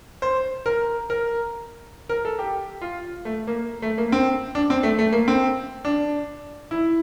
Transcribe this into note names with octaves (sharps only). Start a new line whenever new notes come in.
C5
A#4
A#4
A#4
A4
G4
F4
A3
A#3
A3
A#3
C4
D4
C4
A3
A3
A#3
C4
D4
E4